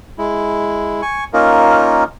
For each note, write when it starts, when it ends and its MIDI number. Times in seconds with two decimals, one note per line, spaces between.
0.18 1.01 56
0.18 1.01 64
1.02 1.24 80
1.02 1.24 85
1.33 2.04 58
1.33 2.04 61
1.33 2.04 63
1.33 2.04 65
1.33 2.04 70